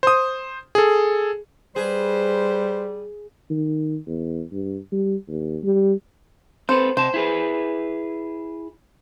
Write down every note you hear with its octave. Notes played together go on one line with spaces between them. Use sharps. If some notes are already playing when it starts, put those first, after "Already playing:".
C5 D#6
G#4 A4
G3 G#4 B4 C5
D#3
E2
G2
G3
D#2
G3
C4 A4 B4 C5
C3 C5 A5
E4 G#4 B4